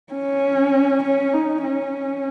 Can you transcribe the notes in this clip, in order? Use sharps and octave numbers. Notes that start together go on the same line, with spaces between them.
C#4
C#4
D#4
C#4